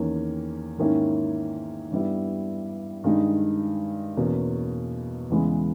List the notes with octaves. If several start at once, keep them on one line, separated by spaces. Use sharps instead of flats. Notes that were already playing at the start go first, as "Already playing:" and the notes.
Already playing: E2 D#3 A#3 C#4
G#2 D#3 A#3 C#4 E4
G2 G3 B3 E4
G2 D#3 G#3 D#4
E2 B2 A#3 C#4
E2 C#3 E3 G#3 B3